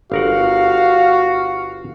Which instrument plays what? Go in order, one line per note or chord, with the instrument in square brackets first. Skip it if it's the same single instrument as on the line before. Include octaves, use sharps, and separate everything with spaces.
[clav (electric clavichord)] G1 A#4 F#5 [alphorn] F#4 [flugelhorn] F5